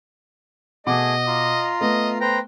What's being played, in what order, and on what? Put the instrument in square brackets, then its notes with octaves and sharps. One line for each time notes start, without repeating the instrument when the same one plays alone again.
[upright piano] B2 F#5 D6 [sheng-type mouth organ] A3 G#4 [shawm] D#5
[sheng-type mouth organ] F4 A#5 C6
[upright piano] A3 B3 [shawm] D#5
[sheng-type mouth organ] B4 C5 G5 [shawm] A#5